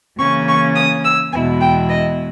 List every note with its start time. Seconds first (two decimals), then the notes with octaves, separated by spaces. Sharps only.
0.19 C#3 E3 A#3 C#4 C#6
0.48 C#6
0.76 D#6
1.04 E6
1.32 E2 B2 G#3 B3 E4 G#5
1.61 G5
1.89 D#5